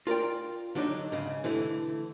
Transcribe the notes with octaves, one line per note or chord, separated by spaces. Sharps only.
F4 A#4 D5 G5
D3 F#3 D4 D#4
G#2 C#3
D3 E3 A3 E4